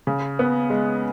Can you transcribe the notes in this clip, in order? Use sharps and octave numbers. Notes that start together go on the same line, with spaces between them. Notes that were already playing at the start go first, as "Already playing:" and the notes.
C#3
B3
G#3